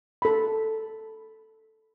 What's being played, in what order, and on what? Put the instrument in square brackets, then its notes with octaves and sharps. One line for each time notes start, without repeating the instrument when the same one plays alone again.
[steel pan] A4 B5